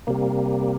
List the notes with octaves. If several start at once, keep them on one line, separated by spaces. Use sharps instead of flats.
C3 G3 A#3